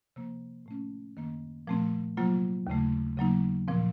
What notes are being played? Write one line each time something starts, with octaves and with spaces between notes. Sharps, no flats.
C3 F3 A#3
A2 A3 C#4
F#2 D#3 A#3
A#2 F3 A3 C4
C3 F#3 A#3 F4
D#2 C#3 A3
C#3 F#3 A#3 D#4
A#2 F3 C4